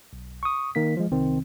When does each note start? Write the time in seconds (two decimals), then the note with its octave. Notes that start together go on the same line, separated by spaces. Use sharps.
0.13 B1
0.43 C#6 D#6
0.75 D#3 A#3 B6
0.97 F3 G#3
1.11 C2 C3 D#3 C4